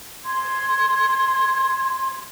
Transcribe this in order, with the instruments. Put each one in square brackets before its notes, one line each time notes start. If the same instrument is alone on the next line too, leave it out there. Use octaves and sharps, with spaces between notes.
[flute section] C6 G#6